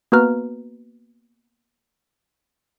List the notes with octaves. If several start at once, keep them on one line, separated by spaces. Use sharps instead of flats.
A#3 B3 F#4 B4 A#5 F6